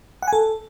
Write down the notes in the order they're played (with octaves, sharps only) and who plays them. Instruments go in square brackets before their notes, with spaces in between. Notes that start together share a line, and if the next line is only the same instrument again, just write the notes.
[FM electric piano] F#5
G#5
A4